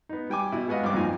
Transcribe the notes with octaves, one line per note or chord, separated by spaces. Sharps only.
B3 D#4
G3 G5 G#5 D6
B2 E4
G#3 B3 F#4 D#5 F5
C#2 G2 C4 D6
F2 A#2 D#4 G#5